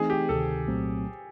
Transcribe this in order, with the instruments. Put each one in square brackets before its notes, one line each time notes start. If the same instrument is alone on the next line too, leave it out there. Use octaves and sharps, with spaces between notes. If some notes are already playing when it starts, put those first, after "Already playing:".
Already playing: [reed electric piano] E3 A3 C4 D#4 [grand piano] G#4
[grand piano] G4
[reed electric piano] D2 C3 D#3 [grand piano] A4
[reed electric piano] C2 A#2 F#3 A3 C4